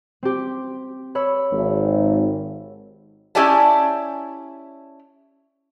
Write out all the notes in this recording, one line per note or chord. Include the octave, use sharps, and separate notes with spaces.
C4 G4
C#5 B5 E6
G#1
C#4 E4 G4 D5 G#5 A5